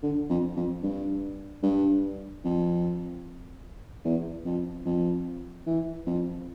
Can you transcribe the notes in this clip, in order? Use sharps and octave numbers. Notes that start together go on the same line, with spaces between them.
D3
F2
F2
G2
G2
F2
E2
F2
F2
E3
F2